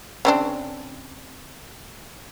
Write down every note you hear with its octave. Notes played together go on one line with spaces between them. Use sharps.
C#3 C4 D4